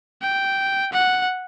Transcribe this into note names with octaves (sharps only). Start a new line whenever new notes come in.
G5
F#5